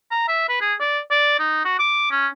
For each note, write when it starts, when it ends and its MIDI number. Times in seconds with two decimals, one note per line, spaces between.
0.11 0.25 82
0.28 0.47 76
0.49 0.60 71
0.61 0.74 68
0.80 1.01 74
1.11 1.34 74
1.39 1.64 63
1.65 1.76 66
1.79 2.07 86
2.11 2.27 61